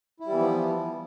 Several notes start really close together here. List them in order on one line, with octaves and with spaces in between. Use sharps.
E4 G3 E3 B3 F3